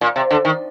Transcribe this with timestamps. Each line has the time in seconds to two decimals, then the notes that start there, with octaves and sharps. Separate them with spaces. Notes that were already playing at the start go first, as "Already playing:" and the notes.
0.01 A#2
0.16 C3
0.31 D3
0.45 D#3